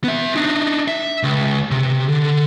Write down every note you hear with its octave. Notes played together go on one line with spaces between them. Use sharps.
B3 E5
D4 D#4
E5
C#2
C3
D3